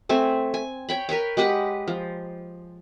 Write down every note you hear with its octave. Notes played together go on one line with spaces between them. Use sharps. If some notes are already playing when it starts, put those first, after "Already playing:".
A3 C4 G#5
G#5
C#5 G5 B5
A#4 B4 C#5 G5
G#3 G4 B4 F#5
F3